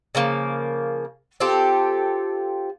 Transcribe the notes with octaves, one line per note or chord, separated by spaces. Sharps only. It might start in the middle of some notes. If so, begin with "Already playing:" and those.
C#3 F3 A#3
C4 F4 G4 A4